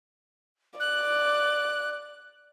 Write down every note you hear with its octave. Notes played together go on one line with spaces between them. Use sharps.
D5 F#6